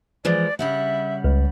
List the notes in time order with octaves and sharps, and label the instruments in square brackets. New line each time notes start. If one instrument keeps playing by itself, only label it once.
[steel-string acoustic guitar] E3 F3 G#3 [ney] D5
[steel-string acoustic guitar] C#3 G3 F#5 [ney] E5
[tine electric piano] C#2